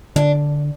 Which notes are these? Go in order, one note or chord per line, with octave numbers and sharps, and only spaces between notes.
D3 D4